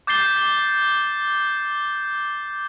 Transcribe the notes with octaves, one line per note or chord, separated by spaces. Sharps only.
D6 G6 A6 C7 G7